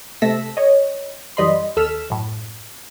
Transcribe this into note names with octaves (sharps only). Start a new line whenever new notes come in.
C3 A3 A4 E6 A#6 B6
C#5 D#5
F#2 E3 G3 D#5 B5 C6
D#2 A4 E6 F6 B6 E7
F#2 A2